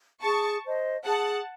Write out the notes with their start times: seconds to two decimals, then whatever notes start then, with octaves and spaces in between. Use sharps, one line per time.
0.23 G#4 A5 C#6
0.64 C5 D#5
1.06 G#4 F#5 A5